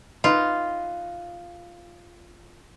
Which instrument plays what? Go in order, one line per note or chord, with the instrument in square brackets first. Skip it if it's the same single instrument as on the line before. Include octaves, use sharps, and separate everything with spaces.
[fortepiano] D#4 B4 D#5 [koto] F4